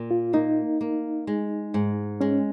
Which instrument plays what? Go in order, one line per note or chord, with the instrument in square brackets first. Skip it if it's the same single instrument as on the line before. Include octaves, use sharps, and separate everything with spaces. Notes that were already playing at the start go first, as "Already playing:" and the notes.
Already playing: [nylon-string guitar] A#2
[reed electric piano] F4
[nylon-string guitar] A#3 [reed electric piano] D#4
[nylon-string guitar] A#3
G#3
G#2
[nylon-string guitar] G#3 [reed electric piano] C#4